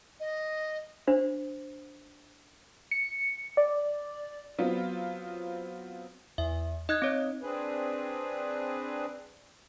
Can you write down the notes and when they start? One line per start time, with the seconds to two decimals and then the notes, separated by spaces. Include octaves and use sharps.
0.20 D#5
1.07 D4 C5
2.91 C#7
3.57 D5
4.59 F#3 B3 C4 F4
6.38 E2 E5
6.89 D#4 D#5 F#6 G#6
7.02 C4 C#5
7.42 C4 D4 G#4 B4